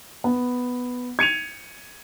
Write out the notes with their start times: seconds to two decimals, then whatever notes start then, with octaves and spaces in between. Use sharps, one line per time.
0.24 B3
1.19 G#6 C#7 D#7 F7